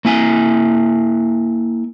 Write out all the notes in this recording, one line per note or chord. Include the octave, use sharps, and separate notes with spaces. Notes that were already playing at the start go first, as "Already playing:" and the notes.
A#3 E4 G#5